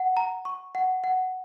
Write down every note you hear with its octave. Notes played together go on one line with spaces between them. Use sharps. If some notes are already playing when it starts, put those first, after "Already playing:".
Already playing: F#5
A#5
C#6
F#5
F#5